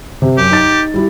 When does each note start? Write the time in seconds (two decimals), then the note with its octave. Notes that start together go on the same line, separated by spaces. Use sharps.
0.22 C3
0.37 F#2 G4
0.51 D#4 A6
0.94 G3 E4 G4